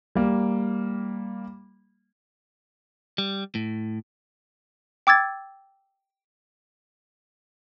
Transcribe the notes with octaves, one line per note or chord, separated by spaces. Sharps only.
G3 A#3
G3
A2
G5 D6 E6 G#6 A6